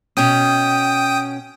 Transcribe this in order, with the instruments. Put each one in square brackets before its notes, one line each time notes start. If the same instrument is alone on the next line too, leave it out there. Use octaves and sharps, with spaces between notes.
[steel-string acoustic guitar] B2 C#4 [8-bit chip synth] G5 D#6